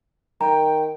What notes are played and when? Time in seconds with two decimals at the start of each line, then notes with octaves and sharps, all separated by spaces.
0.41 D#3 G5 A#5